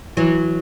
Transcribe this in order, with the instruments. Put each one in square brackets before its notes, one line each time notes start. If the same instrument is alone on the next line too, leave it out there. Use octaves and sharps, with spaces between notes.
[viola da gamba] E3 [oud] F#3